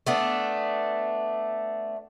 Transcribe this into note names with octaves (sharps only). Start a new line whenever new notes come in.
A3 B3 D4